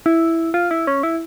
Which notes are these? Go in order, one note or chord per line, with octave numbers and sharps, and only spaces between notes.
E4
F4
E4
C#4
E4